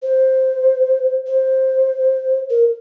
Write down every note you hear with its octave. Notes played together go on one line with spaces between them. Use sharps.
C5
C5
A#4